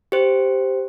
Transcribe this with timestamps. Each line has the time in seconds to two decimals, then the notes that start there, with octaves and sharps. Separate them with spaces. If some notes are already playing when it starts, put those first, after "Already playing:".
0.12 G4 C5